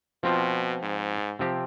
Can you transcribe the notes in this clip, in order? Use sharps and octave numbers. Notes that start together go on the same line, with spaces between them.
B2 F3 C4 F4
G#2
C3 F3 C4 G4